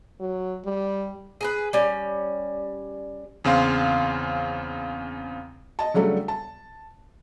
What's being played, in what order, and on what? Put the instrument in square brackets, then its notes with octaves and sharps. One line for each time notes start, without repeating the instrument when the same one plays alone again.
[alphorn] F#3
G3
[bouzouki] G#4 A#4 B4
G3 C#4
[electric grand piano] E2 C#3 C4 F5 C6
[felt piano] D#5 A5
C#3 F#3 G3 A3 D4
A5